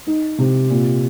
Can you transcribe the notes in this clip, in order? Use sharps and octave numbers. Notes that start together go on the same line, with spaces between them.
D#4
C3
A#2